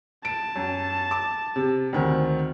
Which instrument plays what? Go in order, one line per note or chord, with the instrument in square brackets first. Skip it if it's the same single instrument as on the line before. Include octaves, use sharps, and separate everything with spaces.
[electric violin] A5 [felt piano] D7
[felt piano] F#2
D6
C3
D2 D#3 C4